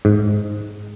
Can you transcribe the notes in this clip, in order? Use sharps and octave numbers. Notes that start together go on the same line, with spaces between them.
G#2